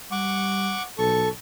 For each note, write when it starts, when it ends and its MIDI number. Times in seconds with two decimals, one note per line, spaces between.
0.11 0.75 55
0.11 0.83 78
0.11 0.83 85
0.11 0.83 86
0.98 1.28 35
0.98 1.28 69
0.98 1.28 85